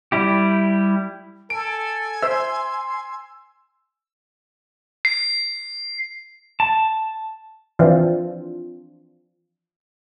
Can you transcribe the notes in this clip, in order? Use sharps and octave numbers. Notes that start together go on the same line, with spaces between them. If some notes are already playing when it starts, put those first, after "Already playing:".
G3 E4 G4
A4 G#5 D7
C5 E5 C6 E6
C7
A5
E3 F3 C4 D4 F4